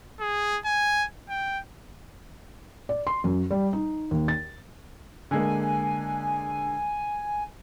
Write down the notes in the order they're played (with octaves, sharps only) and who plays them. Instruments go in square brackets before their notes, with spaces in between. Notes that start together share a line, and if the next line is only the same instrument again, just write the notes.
[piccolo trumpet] G#4
G#5
G5
[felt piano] D5
C6
F#2
G3
D#4
D#2
A6
[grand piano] D3 G#3 A#3 [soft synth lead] G#5